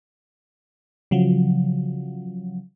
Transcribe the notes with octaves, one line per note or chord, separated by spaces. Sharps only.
C#3 F3 F#3